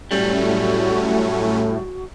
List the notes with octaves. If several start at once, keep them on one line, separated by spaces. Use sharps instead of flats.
A2 F#3 G3 A3 C#4 F#4